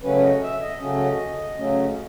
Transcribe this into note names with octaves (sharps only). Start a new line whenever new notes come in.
C#3 F#3 A3 C#4 B4
C#5
D#5
E5
D#5
C#3 F#3 A3 C#4
C#3 F#3 A3 C#4